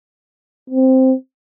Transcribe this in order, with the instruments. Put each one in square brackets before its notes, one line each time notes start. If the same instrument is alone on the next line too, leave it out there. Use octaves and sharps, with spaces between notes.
[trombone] C4